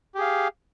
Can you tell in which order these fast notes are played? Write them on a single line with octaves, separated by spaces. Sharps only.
G4 G#4 F5